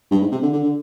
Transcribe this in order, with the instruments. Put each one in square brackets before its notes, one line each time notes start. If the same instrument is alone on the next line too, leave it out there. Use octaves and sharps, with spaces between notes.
[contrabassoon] G2
G#2
C3
D3
D3
D3